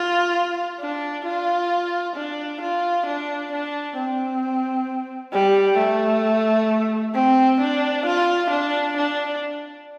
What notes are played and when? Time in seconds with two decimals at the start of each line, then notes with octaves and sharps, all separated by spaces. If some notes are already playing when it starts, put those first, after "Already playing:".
Already playing: F4
0.80 D4
1.26 F4
2.16 D4
2.61 F4
3.07 D4
3.52 D4
3.97 C4
5.33 G3
5.79 A3
7.15 C4
7.61 D4
8.06 F4
8.51 D4
8.97 D4